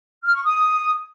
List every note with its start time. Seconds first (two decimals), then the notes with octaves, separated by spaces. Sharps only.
0.23 F6
0.34 C#6
0.44 D#6